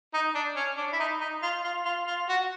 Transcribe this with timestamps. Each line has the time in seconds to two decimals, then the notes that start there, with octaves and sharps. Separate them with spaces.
0.14 D#4
0.35 D4
0.56 C#4
0.78 D4
0.93 E4
1.00 D#4
1.21 D#4
1.43 F4
1.64 F4
1.85 F4
2.07 F4
2.29 F#4